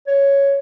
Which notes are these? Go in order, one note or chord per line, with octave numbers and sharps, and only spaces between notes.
C#5